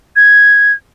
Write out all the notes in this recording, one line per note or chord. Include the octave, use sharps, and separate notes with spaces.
G#6